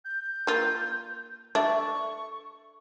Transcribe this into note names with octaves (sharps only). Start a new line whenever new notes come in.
G6
A#3 F4
D4 A4 E5 C#6